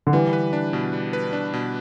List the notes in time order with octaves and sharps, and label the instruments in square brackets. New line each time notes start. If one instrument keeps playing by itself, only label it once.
[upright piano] D3
[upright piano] E3 [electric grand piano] G3
[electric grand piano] B4
D4
B2
G3
B4
D4
B2